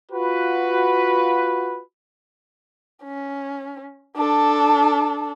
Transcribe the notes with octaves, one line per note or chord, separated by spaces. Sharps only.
F4 F#4 B4
C#4
D4 A4